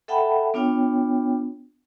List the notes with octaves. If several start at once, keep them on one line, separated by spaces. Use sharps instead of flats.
A4 E5 F#5 G5 A5 B5
B3 D4 F4 C#5 G5